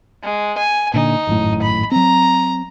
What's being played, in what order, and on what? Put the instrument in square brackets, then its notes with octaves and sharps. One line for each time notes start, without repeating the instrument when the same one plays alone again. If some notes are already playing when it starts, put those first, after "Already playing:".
[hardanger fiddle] G#3
G#5
[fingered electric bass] A#2 D3 [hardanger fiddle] D#4
[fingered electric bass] G#1 F#2 A2
[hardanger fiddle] B5
[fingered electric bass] F#3 C4 [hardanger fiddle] A#5